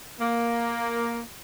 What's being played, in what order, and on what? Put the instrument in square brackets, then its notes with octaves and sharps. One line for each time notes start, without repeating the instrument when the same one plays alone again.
[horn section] A#3